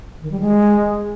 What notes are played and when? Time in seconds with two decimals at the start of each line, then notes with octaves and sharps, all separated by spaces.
0.22 D#3
0.31 G3
0.40 G#3